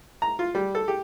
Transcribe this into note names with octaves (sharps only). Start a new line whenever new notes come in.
A#5
F4
G3
A4
G4